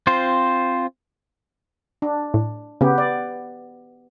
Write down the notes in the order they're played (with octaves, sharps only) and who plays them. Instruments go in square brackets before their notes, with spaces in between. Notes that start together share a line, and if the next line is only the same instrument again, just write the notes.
[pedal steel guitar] C4 F4 C5
[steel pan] D4
[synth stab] A2
[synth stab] C#3 [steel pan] B3 G4
[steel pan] D5